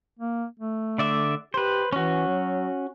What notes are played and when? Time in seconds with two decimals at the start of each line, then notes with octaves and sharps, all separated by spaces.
0.19 A#3
0.59 A3
0.98 D3 D5 E5
1.54 G4 B4 C5
1.93 E3 C#4 F#4
2.27 F#3